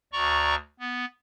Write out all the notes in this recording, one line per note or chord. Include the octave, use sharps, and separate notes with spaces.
D2 D5 A#5 C#6
B3